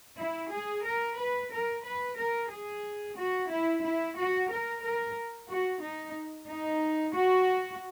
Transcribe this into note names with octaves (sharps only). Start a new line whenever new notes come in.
E4
G#4
A#4
B4
A#4
B4
A#4
G#4
F#4
E4
E4
F#4
A#4
A#4
F#4
D#4
D#4
F#4